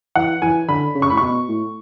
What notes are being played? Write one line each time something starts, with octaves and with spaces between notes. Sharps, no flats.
E3 F#5
E3 G#5
D3 B5
C#3
C#6
A2 B5
B2 C#6
A2